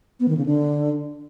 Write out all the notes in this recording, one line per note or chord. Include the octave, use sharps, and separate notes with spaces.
B3
D#3
C#3
D3